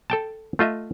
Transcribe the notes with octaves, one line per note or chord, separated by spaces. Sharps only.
A4 G5 A5
A3 F4 D#5 E5